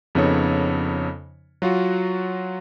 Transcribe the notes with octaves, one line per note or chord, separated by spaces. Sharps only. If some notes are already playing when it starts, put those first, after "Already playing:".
F2 C#3 B3 D#4 A4 C#5
F#3 F4 F#4